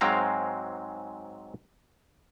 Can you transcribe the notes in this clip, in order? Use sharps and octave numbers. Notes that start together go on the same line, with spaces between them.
G#2 F#3 G#3 C4 F5 A#5